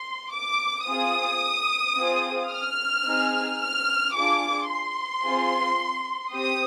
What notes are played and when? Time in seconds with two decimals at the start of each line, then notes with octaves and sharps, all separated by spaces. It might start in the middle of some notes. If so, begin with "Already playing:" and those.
Already playing: C6
0.32 D6
0.87 C4 F4 G#4 D#6
1.96 C4 F4 G#4
2.51 F6
3.05 C4 D#4 G#4
3.60 F6
4.14 D4 F4 G#4 D6
4.69 C6
5.24 C4 F4 G#4
6.33 C4 G4 D#6